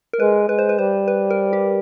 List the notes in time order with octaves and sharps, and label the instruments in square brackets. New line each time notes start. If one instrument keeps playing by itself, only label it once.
[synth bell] A#4
[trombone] G#3 [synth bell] B4
[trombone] G#3 [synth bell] B4
[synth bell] C5
B4
[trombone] G3 [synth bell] C5
[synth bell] B4
A#4
G4